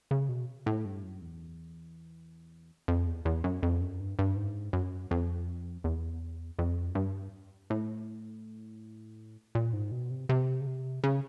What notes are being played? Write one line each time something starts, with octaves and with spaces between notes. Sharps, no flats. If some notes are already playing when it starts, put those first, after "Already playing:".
C#3
B2
A2
G2
F#2
E2
F2
E2
E2
F#2
F2
F#2
G2
G2
G#2
F#2
F2
E2
F2
F#2
G2
A2
A#2
G#2
B2
C3
C3
C#3
C3
C#3